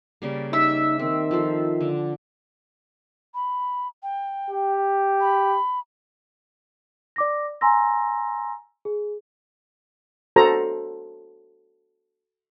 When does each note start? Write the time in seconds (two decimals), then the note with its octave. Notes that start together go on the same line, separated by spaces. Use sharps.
0.22 C#3 G3 A#3
0.53 D#4 G4 E5
0.99 D#3 C4
1.31 F3 A4 C5
1.81 D3
3.35 B5
4.03 G5
4.50 G4
5.21 B5
7.16 D5 D6 A#6
7.61 G#5 A#5 C6 E6 A#6
8.85 G#4
10.36 F#4 A4 C5 A#5